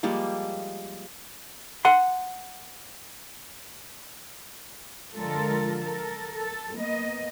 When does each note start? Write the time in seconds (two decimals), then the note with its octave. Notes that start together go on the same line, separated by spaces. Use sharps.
0.03 F3 G3 G#3 A#3
1.85 F#5 C6
5.14 D3 F3 G#3 F4 A4 A#4
5.80 A4 A#4
6.34 A4
6.77 A#3 B3 D#5